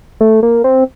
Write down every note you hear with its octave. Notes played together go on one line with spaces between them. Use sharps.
A3
A#3
C4